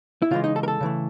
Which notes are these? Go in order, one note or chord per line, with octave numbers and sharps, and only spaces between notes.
E4
C#3 E3 G#3 F4
D#4
A4
A#4
A4
C#3 E3 A3